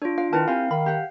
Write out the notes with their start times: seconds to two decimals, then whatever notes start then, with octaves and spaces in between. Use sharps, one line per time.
0.02 D4 F4 C#5
0.18 F4 F5
0.33 D#3 E4 F4 A#4 B4 A5
0.48 C4 G4 F5 G#5
0.71 D#3 B5
0.86 G4 F#5